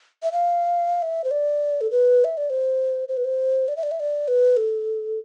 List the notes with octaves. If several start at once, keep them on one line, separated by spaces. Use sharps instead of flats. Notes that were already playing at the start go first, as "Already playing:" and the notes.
E5
F5
E5
C5
D5
A4
B4
E5
D5
C5
C5
B4
C5
D5
E5
D5
E5
D5
B4
A4